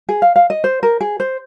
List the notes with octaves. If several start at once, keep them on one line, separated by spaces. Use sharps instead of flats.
G#4
F5
F5
D#5
C5
A#4
G#4
C5